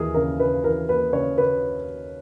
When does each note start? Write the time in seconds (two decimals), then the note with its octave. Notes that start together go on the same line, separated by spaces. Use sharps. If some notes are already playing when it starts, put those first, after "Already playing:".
Already playing: D#2 E3 G#4 A#4
0.14 C#3 A#4
0.40 C#3 B4
0.64 E3 A#4
0.89 A#3 B4
1.13 C#3 C#5
1.38 C#3 B4